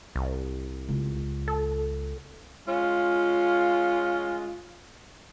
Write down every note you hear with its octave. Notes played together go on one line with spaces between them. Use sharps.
C2
C#2
A4
G#3 C#4 F4